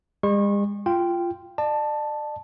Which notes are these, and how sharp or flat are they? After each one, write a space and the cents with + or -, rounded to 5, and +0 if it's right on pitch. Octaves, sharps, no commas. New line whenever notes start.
G#3 -45 C#6 -30
F4 -10 G5 +0
D5 +40 A5 +0